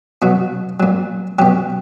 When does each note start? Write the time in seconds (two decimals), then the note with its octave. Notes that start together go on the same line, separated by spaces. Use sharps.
0.22 B2 F#3 F#4
0.80 A#2 F#3
1.39 B2 F#3 G4